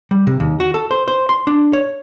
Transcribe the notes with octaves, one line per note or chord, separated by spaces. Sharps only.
G3
C3
D#2
F#4
A4
C5
C5
C6
D4
C#5